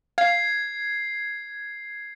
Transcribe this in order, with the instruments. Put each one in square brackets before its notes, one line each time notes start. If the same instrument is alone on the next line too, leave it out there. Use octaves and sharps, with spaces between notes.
[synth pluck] F5 [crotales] G#6 C7